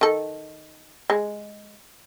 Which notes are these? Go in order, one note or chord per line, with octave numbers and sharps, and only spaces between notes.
D#3 A4
G#3